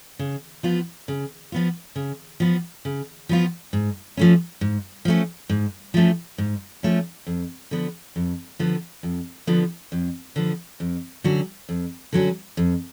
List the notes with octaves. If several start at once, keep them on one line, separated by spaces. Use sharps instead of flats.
C#3
F3 B3 F4
C#3
F3 B3 F4
C#3
F3 B3 F4
C#3
F3 B3 F4
G#2
F3 A3 C#4
G#2
F3 A3 C#4
G#2
F3 A3 C#4
G#2
F3 A3 C#4
F2
D3 F3 B3
F2
D3 F3 B3
F2
D3 F3 B3
F2
D3 F3 B3
F2
D3 F#3 C#4 F#4
F2
D3 F#3 C#4 F#4
F2